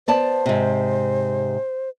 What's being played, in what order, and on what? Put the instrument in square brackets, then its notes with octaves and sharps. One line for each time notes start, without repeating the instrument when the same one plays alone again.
[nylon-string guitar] B3 D5 A5 [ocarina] C5
[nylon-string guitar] G#2 C3